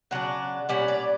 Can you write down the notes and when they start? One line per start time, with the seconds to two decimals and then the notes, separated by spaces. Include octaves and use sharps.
0.11 C#3 F#3 D4 F#5
0.69 A#2 G3 C#4 F#5
0.88 D5